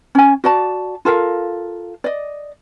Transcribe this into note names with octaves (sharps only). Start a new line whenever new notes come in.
C#4 G#5
F#4 D5 A5
F4 A4 A#4 F5
D5 D#5